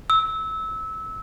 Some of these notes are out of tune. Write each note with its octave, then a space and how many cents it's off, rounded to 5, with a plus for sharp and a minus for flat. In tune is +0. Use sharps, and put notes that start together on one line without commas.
E6 -20